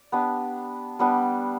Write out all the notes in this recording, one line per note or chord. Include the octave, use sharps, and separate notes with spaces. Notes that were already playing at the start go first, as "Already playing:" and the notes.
Already playing: D5
B3 D4 G4
G3 B3 D4 G4